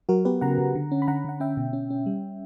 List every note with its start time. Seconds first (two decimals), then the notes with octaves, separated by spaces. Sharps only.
0.09 F#3 F#4 A#4
0.25 B3 G4 B4
0.41 C#3 F#5 A#5
0.58 C#3
0.75 D3
0.91 C#4
1.02 B5
1.07 D3 F#5 A#5
1.25 D3 F#5
1.40 C#4 E5 G5
1.57 B2
1.73 C#4
1.90 C#4
2.06 G3